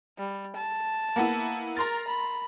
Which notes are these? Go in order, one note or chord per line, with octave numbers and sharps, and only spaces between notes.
G3
A5
A#3 B3 E4
A#4 A#5 C6 A6
B5